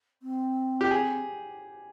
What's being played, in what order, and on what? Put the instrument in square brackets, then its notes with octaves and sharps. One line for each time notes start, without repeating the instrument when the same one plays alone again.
[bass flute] C4
[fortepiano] G4
G#4